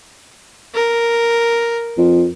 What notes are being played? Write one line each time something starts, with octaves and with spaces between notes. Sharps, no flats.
A#4
F2